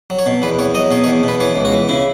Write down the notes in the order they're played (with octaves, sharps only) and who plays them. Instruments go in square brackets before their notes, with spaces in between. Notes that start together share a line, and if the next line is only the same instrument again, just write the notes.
[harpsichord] F#3
C#5
B2
E2 B4
E2 C#5
F#3 D#5
B2 C#5
C#5
E2
B2 B4
E3 C#5
C#2
F#4
E3
C#3 E4